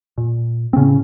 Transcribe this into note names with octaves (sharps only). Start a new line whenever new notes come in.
A#2
C4
A2 C#3 C#4